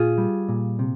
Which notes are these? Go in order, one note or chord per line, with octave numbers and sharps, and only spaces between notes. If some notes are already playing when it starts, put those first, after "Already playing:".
Already playing: A#2 F4 G#4
G3
A#2
C3